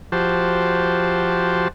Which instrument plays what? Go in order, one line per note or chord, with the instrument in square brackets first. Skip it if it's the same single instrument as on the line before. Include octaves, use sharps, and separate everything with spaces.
[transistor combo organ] F3 F#4 G4 C5 A5